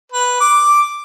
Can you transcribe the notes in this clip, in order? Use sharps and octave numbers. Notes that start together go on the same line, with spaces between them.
B4
D6